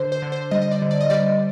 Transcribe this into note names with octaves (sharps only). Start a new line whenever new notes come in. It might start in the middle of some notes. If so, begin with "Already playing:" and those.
Already playing: D3 C5
C5
D3
C5
G3 D#5
D#5
D5
D3
D5
D#5
G3 D5